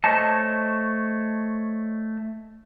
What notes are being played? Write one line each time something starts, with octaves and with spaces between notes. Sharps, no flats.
A3 C5 C#5 D#5 A5